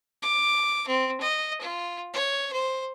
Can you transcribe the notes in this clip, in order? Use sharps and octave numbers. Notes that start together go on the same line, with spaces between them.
D6
C4
D#5
F4
C#5
C5